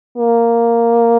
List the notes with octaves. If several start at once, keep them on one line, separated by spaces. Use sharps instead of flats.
A#3